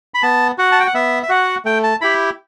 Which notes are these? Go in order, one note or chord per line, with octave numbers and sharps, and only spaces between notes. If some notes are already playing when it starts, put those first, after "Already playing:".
B5
B3 A5
F#4 F#5
A5
G5
F#5
B3 E5
E5
F#4 F#5
A3 G5
A5
E4 G4 B5